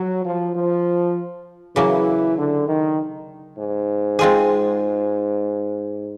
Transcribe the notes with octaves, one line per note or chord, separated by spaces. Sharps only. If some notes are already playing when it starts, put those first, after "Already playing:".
Already playing: F#3
F3
F3
C#3 E3 F#3 A#3
D3
D#3
G#2
G#3 C4 F4 G#4